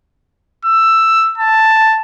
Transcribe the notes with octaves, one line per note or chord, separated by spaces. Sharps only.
E6
A5